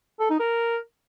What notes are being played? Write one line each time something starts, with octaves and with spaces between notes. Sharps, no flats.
A4
D#4
A#4